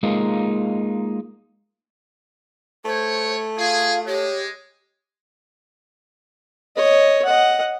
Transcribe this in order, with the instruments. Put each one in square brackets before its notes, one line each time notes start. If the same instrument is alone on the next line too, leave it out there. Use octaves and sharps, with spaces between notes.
[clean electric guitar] G#3 A#3 D#4 F4
[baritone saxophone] A3 [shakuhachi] C5 [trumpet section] C#5
[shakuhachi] F4 [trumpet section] G#4 [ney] F5
[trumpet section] G#3 [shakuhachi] G4 [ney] C#5
[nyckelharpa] C#5 D#5
D#5 F#5